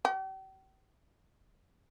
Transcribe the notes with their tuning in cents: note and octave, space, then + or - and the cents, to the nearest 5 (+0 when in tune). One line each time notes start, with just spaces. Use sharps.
G4 -40